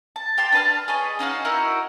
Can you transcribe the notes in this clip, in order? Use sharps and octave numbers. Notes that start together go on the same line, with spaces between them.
A5
G4 G5 A5 C6
D4 B4 A5 F6
G#4 B4 C#5 D#5
C#4 D#4 F#4 F5
D#4 E4 F#4 A#4